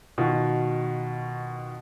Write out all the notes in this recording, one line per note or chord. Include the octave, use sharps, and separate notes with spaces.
B2 D#3 F4 F#4